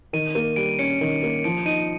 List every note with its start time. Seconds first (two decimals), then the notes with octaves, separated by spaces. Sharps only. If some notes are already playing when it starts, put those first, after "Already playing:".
0.13 D#3 D#7
0.35 A#3 D#7
0.56 G3 D7
0.79 C#4 C#7
1.01 D#3
1.23 A#3
1.44 F3 D7
1.66 D#4 D#7